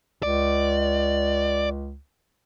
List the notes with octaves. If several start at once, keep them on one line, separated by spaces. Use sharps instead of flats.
C#2 D5